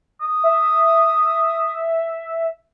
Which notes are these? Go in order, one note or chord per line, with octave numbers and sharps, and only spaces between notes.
D#6
E5